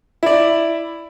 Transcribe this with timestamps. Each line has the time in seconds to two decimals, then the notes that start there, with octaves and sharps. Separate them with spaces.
0.23 E4 D5